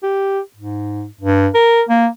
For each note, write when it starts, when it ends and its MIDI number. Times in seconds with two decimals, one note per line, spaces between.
0.03 0.40 67
0.56 1.05 44
1.21 1.48 43
1.54 1.82 70
1.89 2.07 58